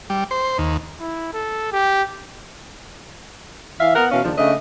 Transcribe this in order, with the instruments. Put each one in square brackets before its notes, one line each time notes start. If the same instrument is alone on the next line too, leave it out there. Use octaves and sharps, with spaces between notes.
[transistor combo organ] G3
C5
D#2
[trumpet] E4
A4
G4
[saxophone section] E3 E5 F5
B3 A#4 F#5
B2 E3 C#4 F5
D#2 C#3 F3 D4
C#3 A3 D4 D#5